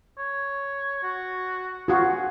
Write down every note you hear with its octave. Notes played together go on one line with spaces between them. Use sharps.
C#5
F#4
F4 F#4 G#4